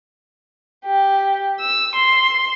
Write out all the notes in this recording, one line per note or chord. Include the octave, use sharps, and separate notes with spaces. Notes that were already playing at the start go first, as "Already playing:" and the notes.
G4
E6
C6